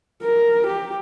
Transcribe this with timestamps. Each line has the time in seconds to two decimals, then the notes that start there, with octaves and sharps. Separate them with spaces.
0.23 A#4
0.67 G4